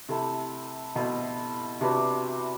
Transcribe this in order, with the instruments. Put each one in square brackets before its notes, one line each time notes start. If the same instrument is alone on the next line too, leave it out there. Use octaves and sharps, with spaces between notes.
[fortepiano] C3 [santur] A3 E4 A4
[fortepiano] B2 [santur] E4 A4 C5
[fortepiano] C3 [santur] D4 F#4 B4 D5